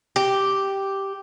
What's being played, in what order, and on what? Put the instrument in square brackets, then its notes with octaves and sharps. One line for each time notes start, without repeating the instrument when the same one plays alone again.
[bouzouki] G4